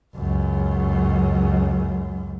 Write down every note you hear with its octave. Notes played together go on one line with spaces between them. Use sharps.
C#2 F#2